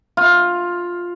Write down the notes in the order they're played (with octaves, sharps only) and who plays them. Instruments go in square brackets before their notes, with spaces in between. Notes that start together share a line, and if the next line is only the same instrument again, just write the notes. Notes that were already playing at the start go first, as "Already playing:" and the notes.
[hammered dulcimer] F4